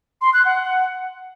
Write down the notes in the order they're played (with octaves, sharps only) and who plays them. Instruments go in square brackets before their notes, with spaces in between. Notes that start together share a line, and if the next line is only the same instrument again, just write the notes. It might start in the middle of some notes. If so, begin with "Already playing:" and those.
[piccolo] C6
F#6
F#5